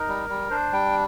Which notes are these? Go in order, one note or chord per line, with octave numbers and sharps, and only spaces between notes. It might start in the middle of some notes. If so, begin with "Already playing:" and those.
Already playing: D#4 A#4
G3
G3
D4 C5
G3 G5